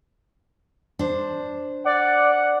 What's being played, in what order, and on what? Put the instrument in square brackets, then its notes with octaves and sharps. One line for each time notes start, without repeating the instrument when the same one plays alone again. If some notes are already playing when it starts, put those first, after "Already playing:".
[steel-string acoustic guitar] D4 C5
[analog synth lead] D5 [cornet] F#5